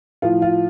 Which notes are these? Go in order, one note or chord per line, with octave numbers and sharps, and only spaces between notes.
A2 F3 F4
F4